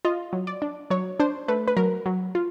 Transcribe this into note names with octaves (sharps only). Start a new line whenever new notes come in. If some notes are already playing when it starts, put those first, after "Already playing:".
F4 D#5
F#3
D5
D4
F#3 C#5
D4 C5
A3 B4
B4
F#3 A#4
F#3
F4